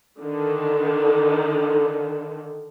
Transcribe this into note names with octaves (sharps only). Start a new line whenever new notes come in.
D3 D#3